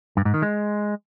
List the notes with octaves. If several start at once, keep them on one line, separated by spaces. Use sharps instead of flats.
G2
G#2
D#3
G#3